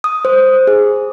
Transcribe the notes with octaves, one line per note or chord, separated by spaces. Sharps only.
D#6
C5
G#4